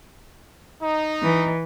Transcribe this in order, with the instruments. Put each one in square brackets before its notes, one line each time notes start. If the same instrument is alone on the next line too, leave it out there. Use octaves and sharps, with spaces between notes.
[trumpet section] D#4
[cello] E3